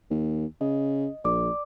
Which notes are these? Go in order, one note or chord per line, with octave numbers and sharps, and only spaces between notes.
D#2
C#3 D#5
A#1 D5 D6